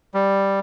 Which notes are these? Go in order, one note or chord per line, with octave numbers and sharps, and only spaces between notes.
G3